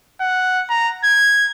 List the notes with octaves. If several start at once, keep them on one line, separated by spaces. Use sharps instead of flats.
F#5
A#5
G#6